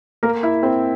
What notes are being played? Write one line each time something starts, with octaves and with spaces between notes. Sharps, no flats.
A#3 A#4
E4 E5
C4 C5